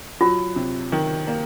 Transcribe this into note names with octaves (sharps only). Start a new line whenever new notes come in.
F#3 F4
C3
D#3
A#3